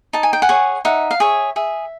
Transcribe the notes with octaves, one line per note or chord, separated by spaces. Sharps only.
D#4 A5
G#5
G5
F#5 G#5
G#4 C#5
D#4 E5 F#5
F5
G#4 C#5 E5
G#4 E5